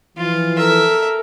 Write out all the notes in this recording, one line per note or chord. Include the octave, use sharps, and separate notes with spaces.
E3 F3 F4
A4 A#4 E5